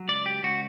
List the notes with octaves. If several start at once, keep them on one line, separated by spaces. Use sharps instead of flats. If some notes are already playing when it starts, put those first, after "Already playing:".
Already playing: F#3
C#2 D5
G4
C#2 F#4